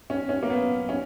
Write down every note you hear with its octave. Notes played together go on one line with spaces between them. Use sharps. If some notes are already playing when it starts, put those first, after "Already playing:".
C#4
C#4
A#3
B3
C#4